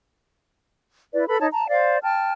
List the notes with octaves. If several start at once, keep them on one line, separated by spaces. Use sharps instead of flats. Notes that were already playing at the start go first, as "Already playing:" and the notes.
E4 B4 D5
A4 B4 B5
D#4 C#5 A5
A5 A#5
C5 D5 F5
G5 A5 F6